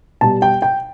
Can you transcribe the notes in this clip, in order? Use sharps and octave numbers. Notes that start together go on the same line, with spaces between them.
B2 G3 A5
G5
G5